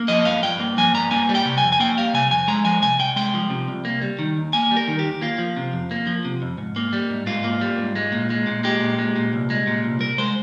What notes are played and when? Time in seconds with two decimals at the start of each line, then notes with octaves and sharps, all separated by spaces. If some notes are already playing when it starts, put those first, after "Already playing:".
Already playing: A#3
0.08 F3 D#5
0.25 G2 F5
0.43 G2 G5
0.60 A#3
0.78 F3 G#5
0.94 G2 A#5
1.11 A#3 G#5
1.29 G3
1.35 G5
1.45 C3
1.58 G#5
1.63 F2
1.72 G#5
1.80 A#3 G5
1.97 G3 F5
2.14 C3 G#5
2.30 F2 G#5
2.48 G#3 A#5
2.65 F3 G#5
2.82 C3 G#5
2.99 C2 G5
3.16 G#3 G5
3.34 F3
3.50 C3
3.68 C2
3.85 A#3
4.02 G3
4.19 D#3
4.37 D#2
4.53 A#3 G#5
4.71 G3
4.77 A#4
4.88 D#3
4.99 G4
5.04 D#2
5.21 A#3 F4
5.38 F3
5.57 C3
5.73 F2
5.91 A#3
6.07 F3
6.25 C3
6.42 F2
6.58 G#2
6.76 A#3
6.93 G3
7.10 G#2
7.26 G#2 F4
7.44 A#3
7.61 G3
7.78 G#2
7.96 G#3
8.12 A#2
8.30 G#3
8.47 A#2
8.64 G#3 G4
8.81 A#2
8.99 G#3
9.16 A#2
9.33 C2
9.50 G#3
9.67 A#2
9.84 C2
10.00 C2 A#4
10.18 G#3 C5